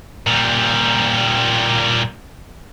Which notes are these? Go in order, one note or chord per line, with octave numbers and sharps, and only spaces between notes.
A#2 G3